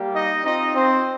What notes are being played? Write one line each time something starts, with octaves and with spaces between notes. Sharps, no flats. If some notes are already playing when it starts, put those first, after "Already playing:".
Already playing: G3 A#3 G4
D#4 D#5
C4 D#4 F4 D#5
C4 C5